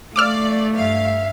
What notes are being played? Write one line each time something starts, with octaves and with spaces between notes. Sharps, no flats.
A3 D5 F5 D6 E6 F6
G2 E5 F5